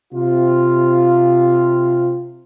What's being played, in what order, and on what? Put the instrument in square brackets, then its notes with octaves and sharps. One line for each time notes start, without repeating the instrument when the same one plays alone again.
[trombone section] C3 F4